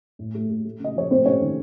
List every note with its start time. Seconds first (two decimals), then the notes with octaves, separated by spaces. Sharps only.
0.19 A2
0.34 A3
0.50 A3
0.65 A3
0.80 C#3 D#5
0.95 F3 C#5
1.11 A3 C4 C5
1.26 C3 C#4 C#5
1.41 D#3